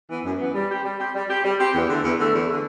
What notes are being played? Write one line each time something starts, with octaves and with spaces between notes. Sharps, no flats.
E3 B3
F#2
E3 B3
G3
C4 G4
G3
C4 G4
G3
C4 G4
G3
C4 G4
E2
D3 A3
E2
D3 A3
E2
D3 A3